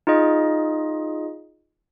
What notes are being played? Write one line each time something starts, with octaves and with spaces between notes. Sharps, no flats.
D#4 F4 G#4 D#5